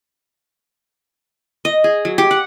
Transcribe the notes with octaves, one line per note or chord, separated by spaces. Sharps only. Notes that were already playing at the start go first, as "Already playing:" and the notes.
D#5
G#4
F#3
G4
F#5